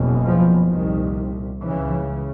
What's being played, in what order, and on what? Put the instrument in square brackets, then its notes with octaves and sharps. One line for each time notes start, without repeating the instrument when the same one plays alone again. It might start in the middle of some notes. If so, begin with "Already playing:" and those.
Already playing: [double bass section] F#1 E2 B2
F3
C2 A#2 D#3
C#2 C#3 E3